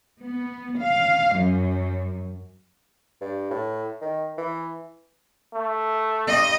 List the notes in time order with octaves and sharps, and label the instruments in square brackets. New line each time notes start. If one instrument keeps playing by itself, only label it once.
[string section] B3
F5
F#2
[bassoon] G2
A2
D#3
E3
[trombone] A3
[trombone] G2 [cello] D#5